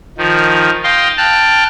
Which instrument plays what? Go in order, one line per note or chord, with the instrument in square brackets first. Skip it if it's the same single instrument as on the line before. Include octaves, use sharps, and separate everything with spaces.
[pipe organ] D#3 F3
D#5 F5 G5 C6
G5 A5 F6 F#6